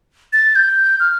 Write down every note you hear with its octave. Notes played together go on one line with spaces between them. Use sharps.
A6
G6
F6